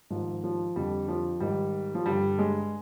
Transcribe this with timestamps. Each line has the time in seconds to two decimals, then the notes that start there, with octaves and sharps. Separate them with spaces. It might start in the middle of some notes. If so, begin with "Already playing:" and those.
0.10 G#2 D#3 F3
0.44 F3
0.76 F2 D3 G3
1.08 F3
1.40 G#2 D#3 G3
1.95 F3
2.06 G2 D3 G3
2.39 G#3